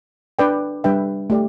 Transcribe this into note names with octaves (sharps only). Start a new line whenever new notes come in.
D4 B4 D5 G5
G3 D4 B4 E5 G5
A3 G4 D5